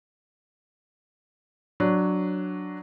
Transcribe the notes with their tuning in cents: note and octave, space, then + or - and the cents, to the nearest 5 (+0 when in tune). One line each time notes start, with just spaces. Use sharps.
F#3 +0 D4 +0 C#5 -5